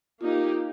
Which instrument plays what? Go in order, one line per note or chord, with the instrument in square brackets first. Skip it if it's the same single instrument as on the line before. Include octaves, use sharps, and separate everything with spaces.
[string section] A#3 D#4 G4 [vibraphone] F4